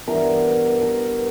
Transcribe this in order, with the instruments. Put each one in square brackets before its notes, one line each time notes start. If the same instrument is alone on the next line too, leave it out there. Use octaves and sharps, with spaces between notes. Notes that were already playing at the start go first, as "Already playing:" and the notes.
[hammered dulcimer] G2 E3 B3 A#4
A#4